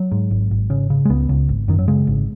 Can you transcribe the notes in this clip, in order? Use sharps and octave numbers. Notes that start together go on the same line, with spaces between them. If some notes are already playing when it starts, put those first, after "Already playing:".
Already playing: F#3
G#2
G#1
G#1
C#3
C#3
G#3
C#2 B3
C#2
G#1
F#2 D#3
F#3
C#3 G#3
G#1